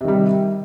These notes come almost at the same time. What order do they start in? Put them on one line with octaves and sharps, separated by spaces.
C3 D#3 G3